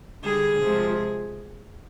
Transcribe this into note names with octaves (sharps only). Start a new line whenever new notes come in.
D3 G3 G#4
C3 F3 G#3